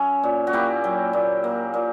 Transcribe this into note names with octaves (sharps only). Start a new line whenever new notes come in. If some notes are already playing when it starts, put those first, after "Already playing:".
Already playing: F#3 C#4 C#5 E5
A#2
F#4
A#3 E4 G4
F#3
A#2
A#3
A#2